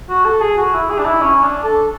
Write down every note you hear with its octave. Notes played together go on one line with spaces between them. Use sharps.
F#4
A4
G#4
F#4
E4
G#4
D4
E4
C#4
D4
A4